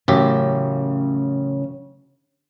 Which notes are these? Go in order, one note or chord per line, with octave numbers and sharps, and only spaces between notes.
A1 F#2 C#3 G4